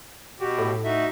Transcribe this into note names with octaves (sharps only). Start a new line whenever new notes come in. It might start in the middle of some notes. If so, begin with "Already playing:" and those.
B2 F#4 G4
A2
D#4 F#4 E5